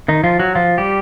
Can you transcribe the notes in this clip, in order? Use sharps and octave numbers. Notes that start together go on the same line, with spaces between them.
D#3 D#4
F3 F4
F#3 F#4
F3 F4
G3 G4